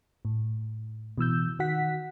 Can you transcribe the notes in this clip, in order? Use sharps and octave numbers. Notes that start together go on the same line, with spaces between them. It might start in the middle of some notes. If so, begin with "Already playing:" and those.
A2
B2 E3 E6 G6
D#3 F#4 F#5 B6